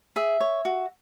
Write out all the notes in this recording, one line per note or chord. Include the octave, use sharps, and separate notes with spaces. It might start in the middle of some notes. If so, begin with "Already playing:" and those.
G#4 E5
C#5
F#4